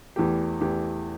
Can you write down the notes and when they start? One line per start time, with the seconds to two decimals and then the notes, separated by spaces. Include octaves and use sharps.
0.16 E2 E3 A3 G4
0.61 E2 E3 A3 G4